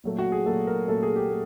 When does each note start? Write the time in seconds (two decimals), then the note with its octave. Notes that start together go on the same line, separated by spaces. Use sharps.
0.04 A#2 F#3 A3
0.19 F#4
0.32 G#4
0.46 A#2 F#3 A3 A4
0.67 A#4
0.88 A#2 F#3 A3 A4
1.03 G#4
1.16 G4
1.30 A3